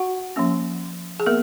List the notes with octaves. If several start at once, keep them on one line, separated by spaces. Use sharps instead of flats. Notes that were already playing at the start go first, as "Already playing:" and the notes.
Already playing: F#4 F#5
F3 A#3 C#4
G#4
A#3 B3 A#4